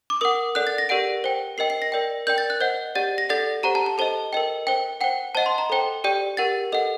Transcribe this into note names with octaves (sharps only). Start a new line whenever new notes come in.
D6
A#4 F#5 D#6
A4 D5 F#5 F#6
A6
A#6
G4 A#4 D5 F#5 D7
C5 G5
A#4 D#5 G5 C7
C7
A#6
A#4 D5 G5
A#4 D5 G5 G6
A6
F#6
C5 D#5 F#5 G6
G4 D5 F#5 A6
A#6
A4 D5 F#5 A6
G4 C5 F#5 A#5
A5
A5
A4 C5 D#5 A5
A#4 D#5 G5
C5 G5
C5 F#5 G5
C5 D#5 F#5 A5
C6
A#5
A4 C5 G5
G4 D5 G5
G4 A#4 F#5 A6
A4 D#5 F#5